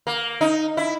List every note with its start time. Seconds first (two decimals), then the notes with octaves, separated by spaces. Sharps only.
0.07 A#3
0.41 D#4
0.77 E4